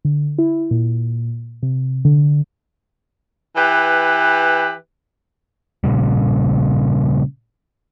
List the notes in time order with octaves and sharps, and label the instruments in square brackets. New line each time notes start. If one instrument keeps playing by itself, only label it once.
[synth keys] D3
E4
A#2
C3
D3
[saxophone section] E3 G4 B4
[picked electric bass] A#2 C#3 G3